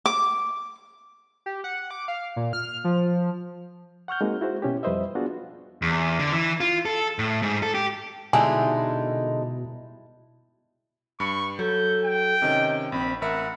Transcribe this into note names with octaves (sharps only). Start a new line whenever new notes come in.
D6
G4
F#5
D6
F5
A#2
F6
F3
F#5 C#6 F6 G6
G#3 A#3 C4 D#4 F#4
E4 F#4 G#4 C5
B2 C#4 E4 G4
F2 G3 B4 C5 D#5 E5
B3 D4 F4 F#4 G#4
E2
D3
E3
F4
A4
A2
G#2
A4
G4
B2 D3 G3 G#3 D#4 E4 G#5
G2 B5 C#6
F#3 A4 G6
G5
C3 D#3 C#4 D#5
A#1 C4 B5
A1 A#4 E5 F#5 B5